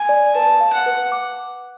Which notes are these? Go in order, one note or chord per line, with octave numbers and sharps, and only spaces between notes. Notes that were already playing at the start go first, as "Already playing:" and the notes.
Already playing: G#5
D5
B4 A5
F5
F#5
B4
D6